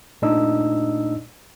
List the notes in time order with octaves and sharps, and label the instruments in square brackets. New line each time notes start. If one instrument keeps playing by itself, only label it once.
[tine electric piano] A#2 A3 D4 D#4 D#5 E6